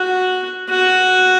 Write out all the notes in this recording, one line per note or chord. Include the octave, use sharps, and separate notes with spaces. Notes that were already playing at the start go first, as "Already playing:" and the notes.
Already playing: F#4
F#4